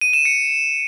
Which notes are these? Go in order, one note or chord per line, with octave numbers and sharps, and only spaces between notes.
D#7
E7
C#7